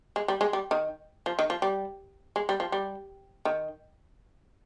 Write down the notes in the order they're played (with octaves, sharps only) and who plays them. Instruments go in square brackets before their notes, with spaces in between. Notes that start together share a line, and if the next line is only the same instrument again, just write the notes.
[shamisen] G#3
G3
G#3
G3
D#3
F3
D#3
F3
G3
G#3
G3
F3
G3
D#3